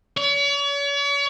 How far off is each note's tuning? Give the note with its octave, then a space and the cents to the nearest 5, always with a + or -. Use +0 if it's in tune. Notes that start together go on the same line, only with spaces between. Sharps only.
C#5 +40